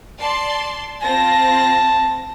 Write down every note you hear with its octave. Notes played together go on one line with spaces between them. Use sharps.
D5 A5 C6
C4 F4 A5 A#6